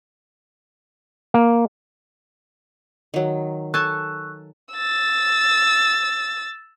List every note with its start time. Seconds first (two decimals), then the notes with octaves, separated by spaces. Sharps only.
1.34 A#3
3.14 D#3 F#3
3.74 A4 G#5 A5 C#6 E6 F#6
4.74 E6 A6